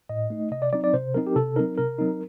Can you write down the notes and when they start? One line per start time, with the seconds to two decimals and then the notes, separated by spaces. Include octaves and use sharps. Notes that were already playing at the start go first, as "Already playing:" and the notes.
0.09 A2 D#5
0.30 A3 D#4
0.51 C3 D#5
0.62 D5
0.73 F#3 C4 D#4 D5
0.84 D5
0.94 C3 C5
1.14 F#3 C4 D#4 A#4
1.27 G4
1.36 C3 A4
1.56 F#3 C4 D#4 A#4
1.78 C3 A#4
1.99 F#3 C4 D#4